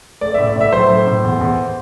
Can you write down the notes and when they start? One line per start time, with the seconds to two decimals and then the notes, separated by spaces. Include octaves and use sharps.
0.21 A3 D5
0.34 A2 E5
0.47 D5
0.56 A2 E5
0.73 F#3 C5
0.89 A2
1.07 A2
1.24 E2
1.41 E2